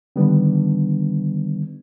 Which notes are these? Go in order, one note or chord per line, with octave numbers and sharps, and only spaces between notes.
D3 D#3 G3 B3 D4